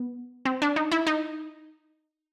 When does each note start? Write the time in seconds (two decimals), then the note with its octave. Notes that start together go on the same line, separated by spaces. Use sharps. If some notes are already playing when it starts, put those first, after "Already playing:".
Already playing: B3
0.45 C4
0.62 D4
0.76 D#4
0.92 E4
1.07 D#4